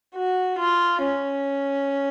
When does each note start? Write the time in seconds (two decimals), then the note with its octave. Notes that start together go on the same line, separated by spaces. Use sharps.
0.14 F#4
0.59 F4
1.03 C#4